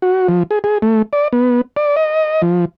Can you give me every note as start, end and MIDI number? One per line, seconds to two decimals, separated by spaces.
0.02 0.28 66
0.28 0.43 53
0.51 0.59 68
0.64 0.78 68
0.82 1.02 57
1.13 1.28 74
1.33 1.61 59
1.76 1.96 74
1.97 2.42 75
2.42 2.65 53